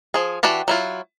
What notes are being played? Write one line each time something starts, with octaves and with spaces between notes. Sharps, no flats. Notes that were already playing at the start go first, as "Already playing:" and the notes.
F3 G#4
E3 D4 F#4 G4 A5
F#3 E4 F4